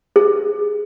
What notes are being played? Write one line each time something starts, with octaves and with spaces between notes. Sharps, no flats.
G#4